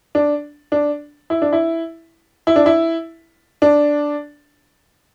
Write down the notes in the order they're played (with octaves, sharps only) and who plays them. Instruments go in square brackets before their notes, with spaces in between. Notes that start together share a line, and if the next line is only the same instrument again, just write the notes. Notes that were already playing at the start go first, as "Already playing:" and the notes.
[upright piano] D4
D4
E4
D4
E4
E4
D4
E4
D4